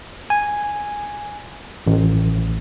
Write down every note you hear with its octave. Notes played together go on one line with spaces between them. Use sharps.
G#5
A1